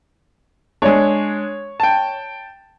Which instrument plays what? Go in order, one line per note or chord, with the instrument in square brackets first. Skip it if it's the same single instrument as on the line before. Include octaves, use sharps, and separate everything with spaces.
[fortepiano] G#3 D4 [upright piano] C#5
[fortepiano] G5 A5